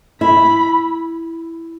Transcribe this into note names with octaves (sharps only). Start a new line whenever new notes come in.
E4 B5